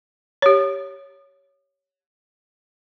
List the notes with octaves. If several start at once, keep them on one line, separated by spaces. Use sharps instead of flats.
G4 C#5